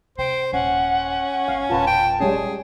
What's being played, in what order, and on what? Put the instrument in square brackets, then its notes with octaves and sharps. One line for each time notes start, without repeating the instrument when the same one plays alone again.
[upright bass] C3 [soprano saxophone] C5 [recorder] G5
[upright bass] D#1 [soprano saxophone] C#4 [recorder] F#5
[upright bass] G1 [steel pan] F5
[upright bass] E1 A#1 [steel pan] F4 B4 [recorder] A5
[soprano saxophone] G5
[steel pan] G3 G#3 C#4 [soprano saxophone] G#4